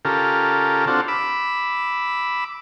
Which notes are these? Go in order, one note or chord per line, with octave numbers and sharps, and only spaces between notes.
C#3 F4 G4 A4 A#4
C4 D4 F4 F#4 A4
B5 D6 E6